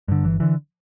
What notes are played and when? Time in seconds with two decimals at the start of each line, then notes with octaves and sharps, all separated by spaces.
0.08 G2 D3
0.24 G1 E3
0.40 D3 E3